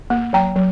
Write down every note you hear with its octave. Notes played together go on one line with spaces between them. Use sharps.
A#3
F#3 G5 A#5
F#3